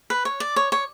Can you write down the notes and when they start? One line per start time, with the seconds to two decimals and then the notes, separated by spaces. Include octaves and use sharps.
0.10 B4
0.25 C#5
0.40 D5
0.56 C#5
0.72 C#5